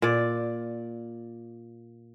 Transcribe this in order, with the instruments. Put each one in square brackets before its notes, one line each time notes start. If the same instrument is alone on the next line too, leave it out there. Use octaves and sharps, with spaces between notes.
[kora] A#2 D5